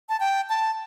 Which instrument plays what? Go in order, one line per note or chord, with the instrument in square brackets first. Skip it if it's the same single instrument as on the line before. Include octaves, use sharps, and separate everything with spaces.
[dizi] A5
G5
A5